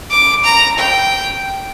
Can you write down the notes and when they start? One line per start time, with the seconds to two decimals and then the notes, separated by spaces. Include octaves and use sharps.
0.11 D6
0.44 A#5
0.78 G5